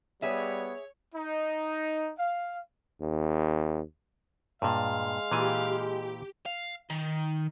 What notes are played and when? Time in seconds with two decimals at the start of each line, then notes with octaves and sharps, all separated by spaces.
0.22 G3 B3 G#4 C#5 E5
1.15 D#4
2.19 F5
3.01 D#2
4.62 G2 A#2 G#3 F5
5.32 A#2 E3 G4 G#5
6.46 F5
6.90 D#3